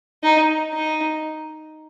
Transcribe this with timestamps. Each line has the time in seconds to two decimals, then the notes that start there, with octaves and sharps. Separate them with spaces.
0.23 D#4
0.73 D#4